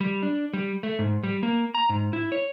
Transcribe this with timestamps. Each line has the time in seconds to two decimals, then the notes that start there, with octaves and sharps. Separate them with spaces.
0.01 G3
0.23 D4
0.53 G3
0.83 A3
0.99 G#2
1.23 G3
1.43 A#3
1.75 A#5
1.89 G#2
2.13 E4
2.32 C#5